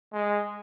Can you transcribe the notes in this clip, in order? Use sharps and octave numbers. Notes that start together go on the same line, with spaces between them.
G#3